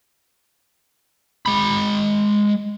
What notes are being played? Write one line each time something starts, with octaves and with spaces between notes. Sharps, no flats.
G#3 B5